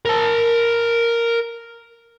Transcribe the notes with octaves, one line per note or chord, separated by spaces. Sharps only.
A#4 A5